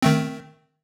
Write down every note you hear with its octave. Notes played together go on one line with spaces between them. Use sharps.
D#3 A3 C4